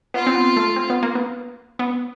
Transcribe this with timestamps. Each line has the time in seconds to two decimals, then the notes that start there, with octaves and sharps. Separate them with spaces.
0.14 B3 F4
0.27 C4
0.35 B3
0.57 A3
0.76 C4
0.90 B3
1.03 A#3
1.15 B3
1.79 B3